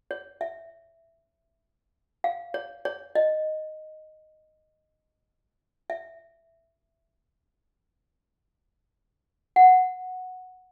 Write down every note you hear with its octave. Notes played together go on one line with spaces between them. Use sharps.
C#5
E5
F5
C#5
C#5
D#5
E5
F#5